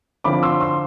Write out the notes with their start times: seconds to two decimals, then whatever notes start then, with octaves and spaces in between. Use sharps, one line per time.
0.24 D3 F3 C4 B5 D6
0.43 C6 E6
0.60 C6 E6